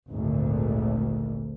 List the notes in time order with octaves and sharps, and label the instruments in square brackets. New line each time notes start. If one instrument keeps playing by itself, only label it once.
[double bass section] G#1 D2 A#2